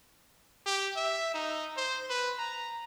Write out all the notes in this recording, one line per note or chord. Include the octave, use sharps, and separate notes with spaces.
G4
E5
D#4
C5
B4
A#5